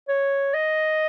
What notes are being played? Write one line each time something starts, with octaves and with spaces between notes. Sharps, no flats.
C#5
D#5